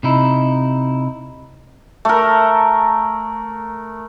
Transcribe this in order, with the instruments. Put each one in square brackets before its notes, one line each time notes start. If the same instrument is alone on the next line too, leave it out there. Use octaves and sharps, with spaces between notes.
[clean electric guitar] C3 D#4 E4
[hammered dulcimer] A3 A#4